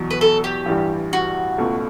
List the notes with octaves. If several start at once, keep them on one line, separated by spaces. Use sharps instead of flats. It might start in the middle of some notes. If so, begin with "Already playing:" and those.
Already playing: E2 B2 F#3
B4
A4
G4
A1 G2 E3 G3
F#4
C#2 B2 A3